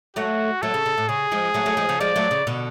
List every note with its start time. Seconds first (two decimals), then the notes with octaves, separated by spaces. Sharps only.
0.16 F#3 A3 F#4
0.62 F#3 A3 A4
0.74 C#3
0.86 C#3
0.98 A2
1.09 C#3 G#4
1.32 F3 G#3
1.54 F#3 A3
1.66 F#3 A3
1.77 F3 G#3
1.89 C#3 F3
2.00 F3 G#3 D5
2.16 F#3 A3
2.31 C#3
2.47 B2 D3